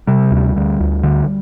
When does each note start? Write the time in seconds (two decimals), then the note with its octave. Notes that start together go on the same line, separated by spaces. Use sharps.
0.07 C3 G3
0.31 D2
0.57 D2
0.80 D2
1.03 D3